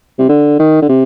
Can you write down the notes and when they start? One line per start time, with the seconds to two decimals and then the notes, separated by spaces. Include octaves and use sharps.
0.18 C3
0.29 D3
0.59 D#3
0.82 D3
0.89 C3